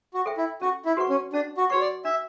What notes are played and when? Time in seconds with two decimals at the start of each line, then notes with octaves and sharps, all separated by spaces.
0.14 F#4
0.26 A4 E5 G5
0.38 E4
0.61 C#4 F#4
0.85 E4
0.97 F#4 B4 F#5 C#6
1.09 C#4
1.33 C#4 D4
1.57 F#4
1.70 F#4 B4 C#5 F#5 C#6
1.81 D5
2.05 D4 E5